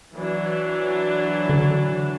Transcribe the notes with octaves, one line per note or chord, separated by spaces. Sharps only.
E3 F#3 D4
D3